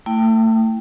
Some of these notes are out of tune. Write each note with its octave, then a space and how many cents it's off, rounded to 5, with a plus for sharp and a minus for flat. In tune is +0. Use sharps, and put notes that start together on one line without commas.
A3 +30 E4 +0 G5 +0